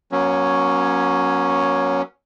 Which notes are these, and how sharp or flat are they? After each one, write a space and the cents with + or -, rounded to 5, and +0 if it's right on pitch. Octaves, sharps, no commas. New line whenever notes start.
F#3 +0 A#3 +40 C#4 +0